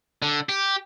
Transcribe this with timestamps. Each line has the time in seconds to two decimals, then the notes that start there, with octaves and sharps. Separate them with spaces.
0.22 D3
0.49 G4